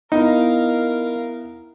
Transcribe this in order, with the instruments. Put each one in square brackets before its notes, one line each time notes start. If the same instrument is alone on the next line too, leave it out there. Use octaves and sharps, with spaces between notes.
[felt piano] B3 E4 [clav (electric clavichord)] D#4 [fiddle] A#4 F5